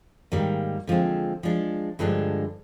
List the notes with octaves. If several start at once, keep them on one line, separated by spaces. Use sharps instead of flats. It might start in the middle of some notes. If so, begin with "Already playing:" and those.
G#2 D#3 G3 A#3
D3 F3 G#3 C4
F3 G#3 D4
G2 D3 F3 G#3 D4